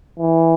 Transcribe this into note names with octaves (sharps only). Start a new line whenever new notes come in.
E3